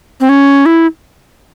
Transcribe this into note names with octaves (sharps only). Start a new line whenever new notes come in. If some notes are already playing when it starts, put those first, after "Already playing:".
C4
C#4
E4